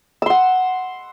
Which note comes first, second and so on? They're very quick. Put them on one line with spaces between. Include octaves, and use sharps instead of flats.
E6 C6 F#5